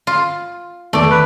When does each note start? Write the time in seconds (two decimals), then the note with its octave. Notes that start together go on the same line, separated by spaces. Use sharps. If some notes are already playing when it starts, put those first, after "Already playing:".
0.07 F4
0.93 E2 D#3 A3 B3 D5
1.11 B4